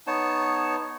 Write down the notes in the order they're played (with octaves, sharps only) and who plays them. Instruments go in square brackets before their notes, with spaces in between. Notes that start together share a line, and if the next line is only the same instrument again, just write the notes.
[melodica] B3 D#4 C#5 A5